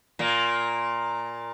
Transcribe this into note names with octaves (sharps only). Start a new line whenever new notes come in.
A#2 A#3